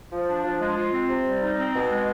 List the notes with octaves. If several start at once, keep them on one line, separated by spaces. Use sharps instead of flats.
F3
D4
F3
G#3
F4
C4
C3
G3
D#4
C4
B2
G#3